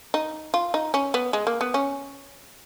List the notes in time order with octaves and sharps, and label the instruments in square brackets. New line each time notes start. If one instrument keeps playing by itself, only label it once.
[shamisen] D#4
F4
D#4
C#4
B3
G#3
A#3
B3
C#4